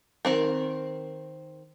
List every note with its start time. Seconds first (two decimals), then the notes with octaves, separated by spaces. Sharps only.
0.25 D#3 C4 A#4